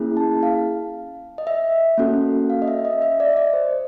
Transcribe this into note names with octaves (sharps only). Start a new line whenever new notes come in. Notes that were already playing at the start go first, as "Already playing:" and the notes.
Already playing: A#3 C#4 E4 G#4
A5
F5
D#5
E5
A#3 C#4 F#4 A4
F5
D#5
E5
D#5
E5
D5
D#5
D5
C5